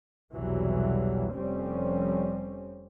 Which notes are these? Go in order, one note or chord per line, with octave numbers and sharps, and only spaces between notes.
B1 E2 C3 E3 F#3 G3
F1 F2 G3 C4 C#4